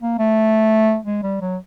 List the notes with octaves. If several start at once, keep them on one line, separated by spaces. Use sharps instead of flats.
A#3
A3
G#3
G3
F#3